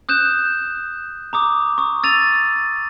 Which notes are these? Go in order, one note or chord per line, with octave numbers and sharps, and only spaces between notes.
D#6 F#6 G6 E7
A#5 D6 D#6
C#6 D#6
E6 A6 D#7 F7